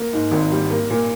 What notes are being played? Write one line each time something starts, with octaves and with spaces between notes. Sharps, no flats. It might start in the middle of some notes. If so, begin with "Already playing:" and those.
Already playing: A#3
G#2
G#1
G3
A#3
A#2